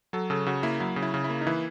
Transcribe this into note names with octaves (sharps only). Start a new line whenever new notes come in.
F#3 A4
C#3 A4
C#3 F#4
A#3 E4
F#3 E4
C#3
E4
C#3
E4
A#3
D#4
E3 E4